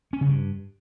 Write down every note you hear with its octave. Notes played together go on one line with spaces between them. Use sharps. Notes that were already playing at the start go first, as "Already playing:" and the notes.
C#4
C#3
G2